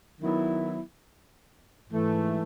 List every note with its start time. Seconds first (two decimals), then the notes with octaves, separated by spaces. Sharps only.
0.20 D#3 F#3 B3 E4
1.88 G#2 E3 A3